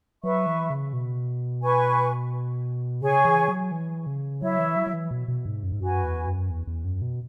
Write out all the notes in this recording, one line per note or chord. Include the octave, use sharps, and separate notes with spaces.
F#3 B4 E5 C#6
E3
C#3
B2
B4 G#5 C#6
C#3 G#4 C#5 G#5 C#6
E3
F#3
E3
C#3
F#3 E4 C#5 E5
E3
F#3
F#3
E3
B2
B2
G#2
F#2
G#2
F#2 F#4 B4 G#5
E2
F#2
E2
E2
F#2
B2